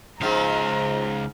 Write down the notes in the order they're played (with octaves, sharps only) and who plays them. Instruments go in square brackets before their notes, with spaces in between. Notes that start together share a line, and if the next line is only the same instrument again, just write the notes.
[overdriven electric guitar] C#2 F5 [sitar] G#2 F3 [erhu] A#5